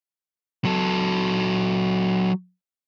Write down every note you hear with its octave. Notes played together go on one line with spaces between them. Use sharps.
F#3 A4